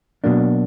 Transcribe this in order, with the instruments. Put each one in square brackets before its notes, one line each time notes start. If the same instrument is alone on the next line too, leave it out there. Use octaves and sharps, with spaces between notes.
[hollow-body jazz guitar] B2 F#3 A#3 D4